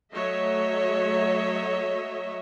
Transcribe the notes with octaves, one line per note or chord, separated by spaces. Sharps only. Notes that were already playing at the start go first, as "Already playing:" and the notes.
F#3 A3 C#5 D#5 E5